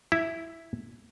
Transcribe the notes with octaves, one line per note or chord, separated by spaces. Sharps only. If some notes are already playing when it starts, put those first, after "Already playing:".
E4